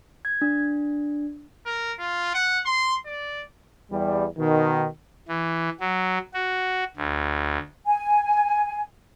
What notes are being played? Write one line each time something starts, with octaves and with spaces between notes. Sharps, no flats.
G#6
D4
A#4
F4
F#5
C6
D5
E2 G3
B2 D#3
E3
F#3
F#4
D2
G#5